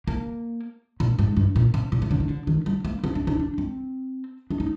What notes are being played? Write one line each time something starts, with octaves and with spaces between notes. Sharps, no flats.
A#3
A#2
G#2
G2
A#2
C3
A#2
C3
D3
D#3
D3
D#3
G3
A#3
C4
D4
D#4
D4
C4
D4
D#4